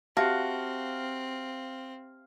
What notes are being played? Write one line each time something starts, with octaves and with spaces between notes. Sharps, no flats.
C4 F#4 G4 E5 F5 A5